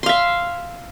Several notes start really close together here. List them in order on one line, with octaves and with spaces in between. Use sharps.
C6 F5 E5